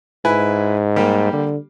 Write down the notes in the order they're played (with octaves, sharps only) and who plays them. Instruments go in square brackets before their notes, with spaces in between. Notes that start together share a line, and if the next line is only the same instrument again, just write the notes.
[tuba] G#2 [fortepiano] E4 B4 G#5
[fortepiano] G3 A#3 G4
[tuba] D3